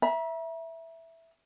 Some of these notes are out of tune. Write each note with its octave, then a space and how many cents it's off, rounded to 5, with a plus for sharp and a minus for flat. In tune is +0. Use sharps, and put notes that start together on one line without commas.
E5 +0 A#5 +40